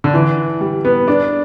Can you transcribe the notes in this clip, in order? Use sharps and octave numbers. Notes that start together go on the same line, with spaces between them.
D3
E3
G3
B3
D4